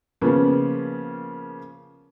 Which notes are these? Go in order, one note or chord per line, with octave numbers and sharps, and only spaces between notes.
C#3 F3 A#3 B3 C#4